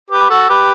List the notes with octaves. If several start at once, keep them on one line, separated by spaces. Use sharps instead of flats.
G4 B4
F#4 A4
G4 B4